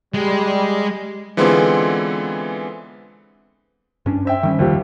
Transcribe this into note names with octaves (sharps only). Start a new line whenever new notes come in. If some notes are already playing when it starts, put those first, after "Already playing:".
G3 G#3
D3 E3 G#3 B3 C4 F4
G2 C#4 D4
C5 E5 G5
D#3 G3 C#4
F#1 D#2 F3 G3 G4